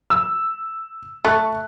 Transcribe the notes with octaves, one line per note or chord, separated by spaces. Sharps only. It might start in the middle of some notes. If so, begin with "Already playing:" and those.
E6
A3 C#6 F#6